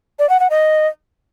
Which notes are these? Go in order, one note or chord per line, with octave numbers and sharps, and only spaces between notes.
D5
F#5
F#5
D#5